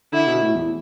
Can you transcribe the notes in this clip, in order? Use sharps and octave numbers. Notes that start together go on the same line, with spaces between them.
D3 E4
B2
A2
E2